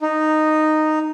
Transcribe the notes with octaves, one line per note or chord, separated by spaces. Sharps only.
D#4